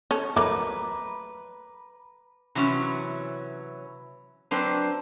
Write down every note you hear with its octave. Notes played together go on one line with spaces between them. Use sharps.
C#4 A4
F#3 A3 A#3 B4 A#5 D6
C3 E3 F#3 C#4
F#3 C4 D4 B4 C5